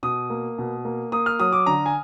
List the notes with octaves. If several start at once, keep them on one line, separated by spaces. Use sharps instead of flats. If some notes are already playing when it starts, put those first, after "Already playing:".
B2 D#6
A#3
B2
A#3
A#3 D#6
F6
F#3 D#6
D6
D3 A#5
G#5